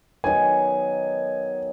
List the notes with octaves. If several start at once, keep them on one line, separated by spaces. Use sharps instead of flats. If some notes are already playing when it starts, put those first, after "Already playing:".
D#3 F#3 B3 G#5